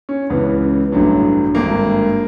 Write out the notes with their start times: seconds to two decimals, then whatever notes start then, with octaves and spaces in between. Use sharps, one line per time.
0.09 C#4
0.30 C#2 C#3 E3 B3
0.92 A1 G2 D3 F#3
1.55 G#1 G2 D3 A#3